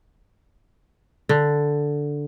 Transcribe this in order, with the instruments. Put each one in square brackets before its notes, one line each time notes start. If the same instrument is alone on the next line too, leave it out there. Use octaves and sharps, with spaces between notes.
[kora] D3